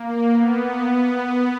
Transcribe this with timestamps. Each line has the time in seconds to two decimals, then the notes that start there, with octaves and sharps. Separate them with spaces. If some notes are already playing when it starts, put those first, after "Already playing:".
Already playing: A#3
0.29 B3